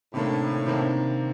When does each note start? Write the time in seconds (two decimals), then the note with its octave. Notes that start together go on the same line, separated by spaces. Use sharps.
0.14 A2 C3 D#3 A#3 D4
0.66 C3 D#3 A#3 D4